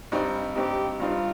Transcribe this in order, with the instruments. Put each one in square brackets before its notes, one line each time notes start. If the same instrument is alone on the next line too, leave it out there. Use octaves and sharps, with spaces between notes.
[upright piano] G2 G3 C4 D#4
[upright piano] G2 G3 C4 D#4 [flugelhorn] G4
[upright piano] G2 G3 C4 D#4 [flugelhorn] F4